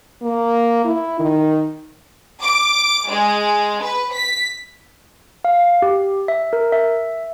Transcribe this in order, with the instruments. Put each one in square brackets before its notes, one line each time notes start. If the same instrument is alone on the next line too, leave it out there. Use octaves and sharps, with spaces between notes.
[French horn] A#3
E4
D#3
[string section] D6
G#3
B4
B6
[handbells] F5
G4
E5
A#4
E5